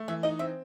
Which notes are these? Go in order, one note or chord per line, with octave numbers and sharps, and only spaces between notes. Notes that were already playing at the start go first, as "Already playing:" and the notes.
Already playing: A3
E3 E5
D#4 D#5
C4 E5